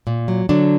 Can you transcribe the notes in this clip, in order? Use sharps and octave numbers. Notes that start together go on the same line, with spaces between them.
A#2
F#3
D3 F#3 D4